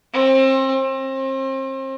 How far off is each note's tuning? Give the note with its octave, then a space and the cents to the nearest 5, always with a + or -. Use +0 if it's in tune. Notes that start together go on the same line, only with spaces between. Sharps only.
C4 +30
C4 +35